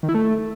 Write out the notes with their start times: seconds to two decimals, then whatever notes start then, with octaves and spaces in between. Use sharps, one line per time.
0.03 D#3
0.09 E4
0.14 A3